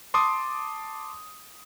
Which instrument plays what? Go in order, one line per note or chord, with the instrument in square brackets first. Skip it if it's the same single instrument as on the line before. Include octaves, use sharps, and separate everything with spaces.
[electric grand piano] A5 C6 D6 D#6